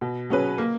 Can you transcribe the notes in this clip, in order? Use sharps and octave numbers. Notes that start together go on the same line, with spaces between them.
B2
F#3 C#4 G#4 B4
A#3